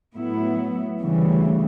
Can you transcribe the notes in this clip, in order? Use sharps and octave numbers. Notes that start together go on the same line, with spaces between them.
A2 F#3 B3 E4
D2 C#3 E3 G3